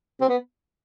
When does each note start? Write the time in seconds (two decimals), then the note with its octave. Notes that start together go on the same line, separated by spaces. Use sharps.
0.21 C4
0.29 B3